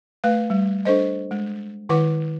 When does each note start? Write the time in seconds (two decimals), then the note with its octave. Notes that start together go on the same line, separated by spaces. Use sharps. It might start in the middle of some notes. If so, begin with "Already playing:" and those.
0.24 A3 B4 F5
0.50 G3
0.85 D4 A4 C5 D#5
1.31 G#3
1.89 D#3 E4 B4 F#5 D6